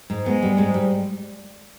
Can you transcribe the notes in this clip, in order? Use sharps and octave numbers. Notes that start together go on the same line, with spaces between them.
G#2
G#3 B3
G3
G#2
G3